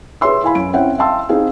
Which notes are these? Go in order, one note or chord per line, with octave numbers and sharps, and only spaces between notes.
G#4 B4 C#5 E5 C6 E6
E4 F5 G#5 B5
F#2 D7
C4 C#4 E4 E5 F#5 G5
E5 F5 G5 A5 C6 E6
C4 D#4 G#4 F5